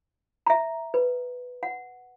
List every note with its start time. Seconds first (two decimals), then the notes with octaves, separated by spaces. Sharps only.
0.47 E5 A#5
0.94 B4
1.63 F#5